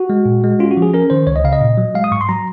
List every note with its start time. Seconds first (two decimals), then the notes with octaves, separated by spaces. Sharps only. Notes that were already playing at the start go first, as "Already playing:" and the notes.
Already playing: F#4
0.10 G#3
0.25 A#2
0.44 G#3
0.59 C#4 F4
0.71 F#4
0.77 F3
0.82 G#4
0.94 C#4 A#4
1.10 D#3 C5
1.27 C#2 C#5
1.36 D#5
1.44 C#3 F5
1.53 D#5
1.61 A#2
1.77 F#3
1.95 G#3 F5
2.04 D#6
2.11 G#2 C#6
2.21 C6
2.29 F#3 A#5